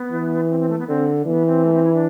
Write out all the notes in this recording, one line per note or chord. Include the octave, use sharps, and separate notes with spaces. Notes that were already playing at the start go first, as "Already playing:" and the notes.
Already playing: B3
E3
C4
C4
A3
B3
D3 C4
E3 B3
C4
A3
C4
E4
D4